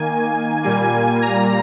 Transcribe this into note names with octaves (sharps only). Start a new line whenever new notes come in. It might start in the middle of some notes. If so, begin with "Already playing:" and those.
Already playing: D#3 A#3 G#5
A#2 G3 A#3 G#5
A#5